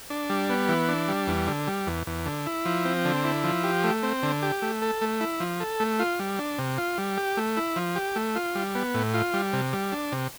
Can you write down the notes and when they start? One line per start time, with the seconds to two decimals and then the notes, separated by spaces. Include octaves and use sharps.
0.10 D4
0.30 G3
0.50 B3
0.69 E3
0.89 D4
1.08 G3
1.27 E2
1.47 D3
1.67 G3
1.87 E2
2.07 E2
2.26 D3
2.46 E4
2.65 F3
2.85 C4
3.05 D3
3.24 E4
3.44 F3
3.64 G4
3.84 A3
4.03 C4
4.23 D3
4.42 G4
4.62 A3
4.82 A4
5.01 A3
5.21 E4
5.40 F3
5.60 A4
5.80 A3
6.00 F4
6.19 G3
6.39 D4
6.58 C3
6.78 F4
6.98 G3
7.17 G4
7.37 A3
7.57 E4
7.76 F3
7.96 G4
8.16 A3
8.35 F4
8.55 G3
8.75 B3
8.94 A2
9.14 F4
9.33 G3
9.53 C3
9.73 G3
9.92 D4
10.12 C3